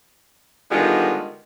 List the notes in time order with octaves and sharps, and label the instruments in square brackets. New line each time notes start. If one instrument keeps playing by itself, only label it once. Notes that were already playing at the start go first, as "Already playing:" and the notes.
[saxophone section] D3 D#3 G3 G#3 B3 F4